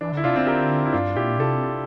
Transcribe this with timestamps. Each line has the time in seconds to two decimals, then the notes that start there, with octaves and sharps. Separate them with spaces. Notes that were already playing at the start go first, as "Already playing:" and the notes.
0.01 E3 D4
0.13 D3 E4
0.24 C3 D4 F4
0.36 D3 C4 E4
0.47 G4 A#4
0.86 E4
0.93 G2 D4 F4
1.16 A#2 E4 G4
1.39 C3 F4 A4